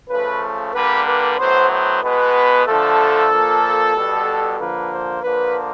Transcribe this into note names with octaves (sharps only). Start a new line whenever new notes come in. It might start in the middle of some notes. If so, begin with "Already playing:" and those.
C#3 F3 A3 B4
D3 G3 A#3 B4
B4
A2 F#3 B3 C5
C5
B2 G#3 B3 B4
D3 F3 A3 A4
A#2 F3 A#3
B2 G3 B3
D3 F3 A#3 B4
C5
D3 F3 A#3 B4